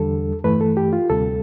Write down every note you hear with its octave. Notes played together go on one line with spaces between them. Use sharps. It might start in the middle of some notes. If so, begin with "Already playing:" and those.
Already playing: E2 D3 G3 A4
G2 E3 A3 B4
A4
G4
F4
D2 C3 G3 A4